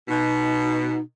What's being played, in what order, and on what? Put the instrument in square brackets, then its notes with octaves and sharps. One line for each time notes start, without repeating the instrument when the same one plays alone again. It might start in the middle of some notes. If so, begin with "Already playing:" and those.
[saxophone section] B2 [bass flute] D#4